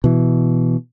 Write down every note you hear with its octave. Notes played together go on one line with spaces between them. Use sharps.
B2 E3